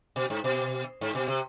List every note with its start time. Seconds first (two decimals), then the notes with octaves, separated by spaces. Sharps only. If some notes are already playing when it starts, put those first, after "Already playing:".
0.16 B2
0.30 G#2
0.44 B2
1.01 G#2
1.15 B2
1.28 C3